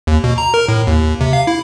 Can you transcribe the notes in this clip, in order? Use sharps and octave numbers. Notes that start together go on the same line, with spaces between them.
D#2
B2
A#5
A#4
A2
D#2
C3
F5
E4